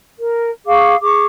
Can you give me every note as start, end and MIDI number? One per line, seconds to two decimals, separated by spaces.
0.17 0.49 70
0.66 0.94 68
0.66 0.94 77
0.66 0.94 85
0.66 0.94 86
1.00 1.26 68
1.00 1.26 85
1.00 1.26 86